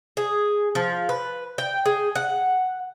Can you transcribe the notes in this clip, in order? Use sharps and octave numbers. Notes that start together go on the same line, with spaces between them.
G#4
F3
B4
G5
G#4
F#5